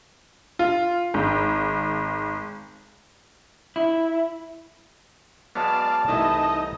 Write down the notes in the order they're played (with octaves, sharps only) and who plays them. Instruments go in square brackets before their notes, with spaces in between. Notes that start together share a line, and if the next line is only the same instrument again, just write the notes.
[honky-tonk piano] F4
G#1
[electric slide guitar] E4
[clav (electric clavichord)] F#3 G#3 B3 [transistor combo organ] D5 F5 [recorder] A5
[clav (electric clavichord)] C2 E3 A3 [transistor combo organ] D#4 D#5